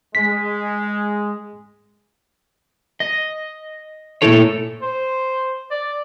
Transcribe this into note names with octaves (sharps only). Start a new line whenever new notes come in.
G#3 B6
D#5
A#2 A3 B3 E4 A4 C#5
C5
D5